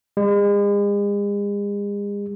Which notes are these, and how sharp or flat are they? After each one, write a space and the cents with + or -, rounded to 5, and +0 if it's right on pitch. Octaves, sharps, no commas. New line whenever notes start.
G#3 -40